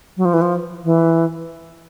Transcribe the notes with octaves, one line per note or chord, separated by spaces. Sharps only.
F#3
F3
E3
F3
E3